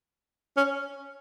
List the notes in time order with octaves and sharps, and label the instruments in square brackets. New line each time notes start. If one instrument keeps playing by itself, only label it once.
[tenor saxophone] C#4